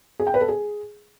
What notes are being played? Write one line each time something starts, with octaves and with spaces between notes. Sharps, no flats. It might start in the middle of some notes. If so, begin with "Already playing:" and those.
G#4
G5
B4
A4
G#4